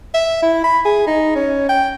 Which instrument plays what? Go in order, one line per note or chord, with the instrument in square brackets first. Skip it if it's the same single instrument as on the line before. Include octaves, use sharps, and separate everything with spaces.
[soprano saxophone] E5
E4
B5
G#4
D#4
C#4
G5